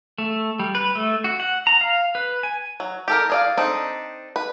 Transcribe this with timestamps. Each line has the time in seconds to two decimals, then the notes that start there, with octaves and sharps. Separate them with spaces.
0.18 A3
0.59 G3
0.75 B4
0.95 A3
1.24 F#4
1.40 F#5
1.67 A#5
1.81 F5
2.15 B4
2.43 G#5
2.80 F#3
3.08 G4 A4 A#4
3.30 G#4 D5 F5
3.57 C4 D4 D#4 A4 D#5
4.36 B4